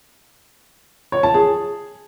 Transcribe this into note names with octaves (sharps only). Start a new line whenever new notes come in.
C#5
A5
G#4